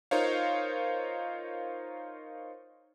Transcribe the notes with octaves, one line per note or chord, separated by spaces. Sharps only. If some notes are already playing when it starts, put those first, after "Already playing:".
D#4 F4 A#4 C5 C#5 F5